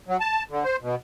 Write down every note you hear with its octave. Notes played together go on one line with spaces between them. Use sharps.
F#3
A5
D3
C5
B2